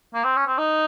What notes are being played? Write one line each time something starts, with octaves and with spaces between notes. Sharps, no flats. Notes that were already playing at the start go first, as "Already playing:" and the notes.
A#3
C4
C#4
C4
D#4